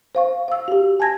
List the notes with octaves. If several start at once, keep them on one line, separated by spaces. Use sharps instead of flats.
C5 F5 C#6
F5 E6
F#4 G4
G#5 A5 G#6 A#6